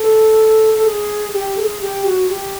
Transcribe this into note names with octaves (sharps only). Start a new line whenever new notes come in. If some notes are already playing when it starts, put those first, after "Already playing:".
Already playing: A4
A4
G#4
G4
A4
G#4
G4
F#4
G4